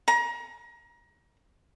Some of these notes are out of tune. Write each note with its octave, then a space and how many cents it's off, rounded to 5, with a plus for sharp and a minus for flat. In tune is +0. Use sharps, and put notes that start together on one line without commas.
A#5 +30